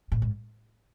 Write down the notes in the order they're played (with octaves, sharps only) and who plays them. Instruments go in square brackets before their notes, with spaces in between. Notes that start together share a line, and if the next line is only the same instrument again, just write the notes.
[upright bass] A2
G#2